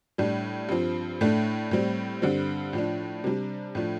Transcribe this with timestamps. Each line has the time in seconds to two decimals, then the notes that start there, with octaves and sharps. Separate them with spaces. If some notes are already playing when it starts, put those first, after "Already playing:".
0.18 A2 G3 D4
0.69 G2 F3 C4
1.21 A2 A3 D4
1.71 A2 G3 C4
2.22 G2 D3 G3 C4
2.73 A2 F3 D4
3.24 C3 G3 D4
3.75 A2 F3 A3 D4